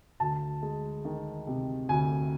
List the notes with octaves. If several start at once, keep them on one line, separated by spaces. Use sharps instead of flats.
D2 A5
G#3
D#3
C3
D2 G#5